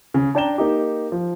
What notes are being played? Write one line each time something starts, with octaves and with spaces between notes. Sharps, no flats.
C#3
D4 D5 G5 A#5 E7 G7
A#3 D#4 G4
F3